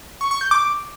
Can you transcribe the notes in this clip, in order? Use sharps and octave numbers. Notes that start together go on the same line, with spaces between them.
C#6
C#6
G6
D6